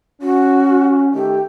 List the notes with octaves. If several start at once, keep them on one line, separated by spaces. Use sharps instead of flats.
C#4 F#4
D#3 A3 G4